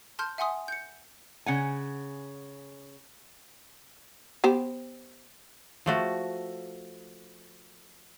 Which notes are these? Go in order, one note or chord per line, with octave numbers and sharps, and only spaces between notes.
A5 C6 F6 G6
E5 F#5 G#5 C6 D#6
G6 C#7
C#3 F#5 G#5
B3 G4 C5
F3 A3 F#4